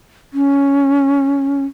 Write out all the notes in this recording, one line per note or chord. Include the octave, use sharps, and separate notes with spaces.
C#4